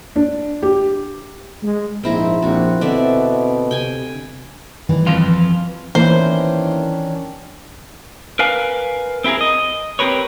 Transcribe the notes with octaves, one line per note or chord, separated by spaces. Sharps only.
D4
G4
G#3
A#1 G#2 C4 E4 A#5
A#1 C4 F#4
B2 D3 C4 D5 E5
C3 G5 G#5
G1 D#3 E3 G3
F2 F4
D#3 E3 A#3 B3 C#4 D4 E4 C5
A#4 B4 F5 G#5
C4 E4 G4 G#4 A#4
D#5
C4 G4 A#4 B4 C#5